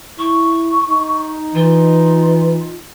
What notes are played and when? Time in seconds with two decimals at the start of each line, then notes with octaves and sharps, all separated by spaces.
0.18 E4 C#6
0.87 D#4
1.54 E3 F4